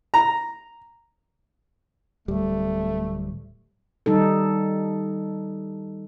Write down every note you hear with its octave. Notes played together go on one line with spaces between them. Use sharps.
A#5
D1 G3 A3
D#3 G3 D#4 A4